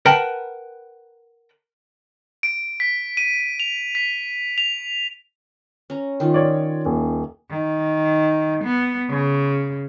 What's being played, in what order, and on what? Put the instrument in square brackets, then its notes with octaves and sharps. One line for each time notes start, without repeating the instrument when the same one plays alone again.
[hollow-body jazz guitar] A#4 B4 F#5 G5 A5 A#5
[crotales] D7
B6
D#7
F7
B6
F7
[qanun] C#4 A#5
D#3 D#4 F4
[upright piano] C#5 D5
D#1
[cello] D#3
B3
C#3